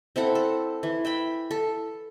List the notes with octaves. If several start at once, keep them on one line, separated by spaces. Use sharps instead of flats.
C4 E4 A4 F#5
A4
E3
E5 G5 B5
A4